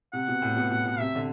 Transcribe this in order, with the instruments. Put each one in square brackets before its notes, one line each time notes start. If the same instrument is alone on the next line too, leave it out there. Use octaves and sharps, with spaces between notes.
[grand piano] C3 [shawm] F#5
[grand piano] B2
A2
B2
B2
B2
[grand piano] C3 [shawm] E5
[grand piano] D3